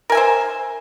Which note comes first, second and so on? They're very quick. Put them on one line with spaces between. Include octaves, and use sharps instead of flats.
A#4 G#5 E5 C5